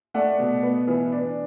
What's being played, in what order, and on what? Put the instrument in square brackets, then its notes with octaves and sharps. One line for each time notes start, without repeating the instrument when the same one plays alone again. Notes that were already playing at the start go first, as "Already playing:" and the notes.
[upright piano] A3 D5 F#5
B2
B3
E3
D4 D5